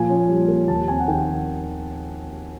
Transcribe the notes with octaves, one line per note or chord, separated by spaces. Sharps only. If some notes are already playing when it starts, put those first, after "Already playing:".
Already playing: A#2 F3 G#5
C#4
G3
A#3
D#2 A5
C4 G#5
F#5
D#3 G5